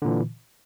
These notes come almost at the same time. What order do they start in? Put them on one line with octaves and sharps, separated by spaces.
D3 A#2 E3